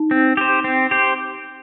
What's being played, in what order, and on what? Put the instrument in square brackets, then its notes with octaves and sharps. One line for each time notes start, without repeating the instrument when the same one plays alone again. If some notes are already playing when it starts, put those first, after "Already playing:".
Already playing: [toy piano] D#4
[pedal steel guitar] C4
G4 C5
C4
G4 C5